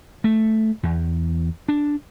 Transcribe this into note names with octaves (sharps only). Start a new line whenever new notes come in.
A3
E2
D4